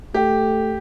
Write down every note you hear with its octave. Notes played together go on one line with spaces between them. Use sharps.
A3 G4